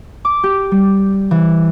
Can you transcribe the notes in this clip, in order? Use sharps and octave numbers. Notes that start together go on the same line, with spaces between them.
D6
G4
G3
E3